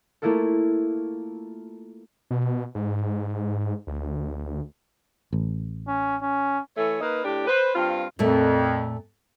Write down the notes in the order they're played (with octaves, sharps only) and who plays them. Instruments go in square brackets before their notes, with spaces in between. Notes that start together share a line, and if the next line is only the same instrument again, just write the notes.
[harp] A3 A#3 E4 F4 A4
[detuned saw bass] B2
G#2
D2
[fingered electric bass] A1
[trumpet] C#4
C#4
[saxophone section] E3 A3 A4 C#5
A#3 D#4 B4
A2 D4 G4
B4 C5
G2 C4 F4
[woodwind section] F2 [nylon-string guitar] A#2 A3 A#3